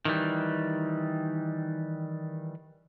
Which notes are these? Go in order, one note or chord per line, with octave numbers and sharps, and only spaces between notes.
D#3 E3 G3